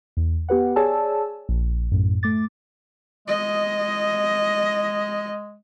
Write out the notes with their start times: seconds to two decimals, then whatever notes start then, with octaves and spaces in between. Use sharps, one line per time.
0.17 E2
0.49 B3 G4 B4 F#5
0.76 G#4 C#5 D5 G#5 A5 E6
1.49 A#1
1.92 F#2 A2
2.23 A3 D6 A6
3.28 G#3 D#5